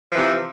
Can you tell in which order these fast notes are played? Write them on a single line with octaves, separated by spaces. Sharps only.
F3 E3 C3